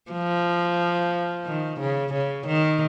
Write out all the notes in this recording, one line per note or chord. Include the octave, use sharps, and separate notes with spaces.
F3
D#3
C#3
C#3
D#3